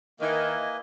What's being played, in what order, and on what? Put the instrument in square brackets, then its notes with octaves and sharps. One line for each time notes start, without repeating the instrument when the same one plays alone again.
[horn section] D#3 [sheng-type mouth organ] A#3 E4 B4 D#5 G#5